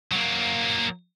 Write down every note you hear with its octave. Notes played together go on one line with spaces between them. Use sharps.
F#3 A#3